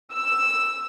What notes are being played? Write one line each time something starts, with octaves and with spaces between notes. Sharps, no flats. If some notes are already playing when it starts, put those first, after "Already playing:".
E6